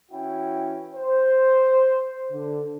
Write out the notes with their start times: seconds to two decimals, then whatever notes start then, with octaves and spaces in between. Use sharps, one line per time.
0.12 E3 C#4 E4 F#4 G5
0.95 C5
2.31 D3